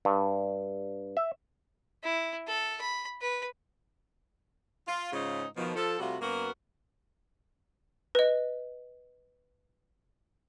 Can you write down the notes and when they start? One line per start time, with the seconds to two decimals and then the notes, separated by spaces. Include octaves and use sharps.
0.05 G2
1.17 E5
2.03 E4
2.47 A4
2.81 B5
3.21 B4
4.88 F4
5.13 G#2 C#3 C#4 D#4 F4 C5
5.57 B2 D#3 F3
5.76 F3 A4
5.99 C3 G3 A3 F4 F#4
6.21 F#2 A#3 B3 F#4 A#4
8.15 B4 D#5